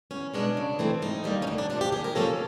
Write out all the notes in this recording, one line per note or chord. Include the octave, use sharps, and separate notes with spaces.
E2 C#4
B2 G#3 B3 D4
C#3
E3 A3 C4
G#2 D#4
D#3 G3 A#3
C#4
D2 D4
D4
C3 F3 D4
G4
D#2 G#4
A#4
C#3 F3 A#3 C#4 A4